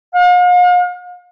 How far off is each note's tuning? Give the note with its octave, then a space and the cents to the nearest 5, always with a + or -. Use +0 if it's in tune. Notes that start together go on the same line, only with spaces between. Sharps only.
F5 +45